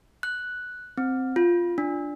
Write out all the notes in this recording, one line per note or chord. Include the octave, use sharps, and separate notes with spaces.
F#6
C4
F4
D4